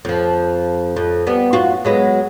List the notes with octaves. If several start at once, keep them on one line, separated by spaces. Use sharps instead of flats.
F2 F3
F2
G3 B3
F#2 F4 F#4
F#3 G#3 B3